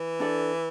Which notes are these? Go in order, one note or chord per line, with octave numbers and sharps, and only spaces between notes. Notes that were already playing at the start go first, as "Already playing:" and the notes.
Already playing: E3
D4 A4 D5